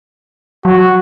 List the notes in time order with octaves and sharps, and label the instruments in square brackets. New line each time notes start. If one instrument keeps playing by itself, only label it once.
[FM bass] F#3 [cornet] F#4